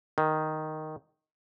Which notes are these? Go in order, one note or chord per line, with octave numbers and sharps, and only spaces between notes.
D#3